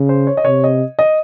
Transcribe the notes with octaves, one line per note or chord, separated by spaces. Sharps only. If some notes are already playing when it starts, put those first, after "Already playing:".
Already playing: C#3
C5
C#5
D#5
C3 C#5
D#5
D#5